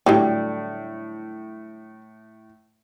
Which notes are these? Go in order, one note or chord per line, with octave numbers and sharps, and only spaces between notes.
A2 D3 F#3 G3